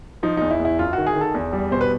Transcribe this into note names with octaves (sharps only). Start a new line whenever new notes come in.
F3 D#4
E2 D#4
E4
E2
E4
F#2 F4
D#3 F#4
G#4
D#3
A4
E2
G3
B2 C5
B4